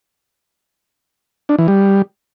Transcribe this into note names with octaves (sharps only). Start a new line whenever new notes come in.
D4
E3
G3